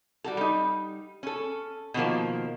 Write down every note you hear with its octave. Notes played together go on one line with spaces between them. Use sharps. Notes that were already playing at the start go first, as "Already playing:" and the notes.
G3 F#4 A4
G3 D#4
C#4 A4
B2 D#3 F3 A#3